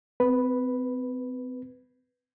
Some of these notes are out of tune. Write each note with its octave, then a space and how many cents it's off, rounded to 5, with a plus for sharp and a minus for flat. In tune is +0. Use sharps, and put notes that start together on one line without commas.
C4 -40 B4 +0